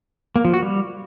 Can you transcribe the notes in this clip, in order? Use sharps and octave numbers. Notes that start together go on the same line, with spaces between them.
A#3
F3
F#4
G3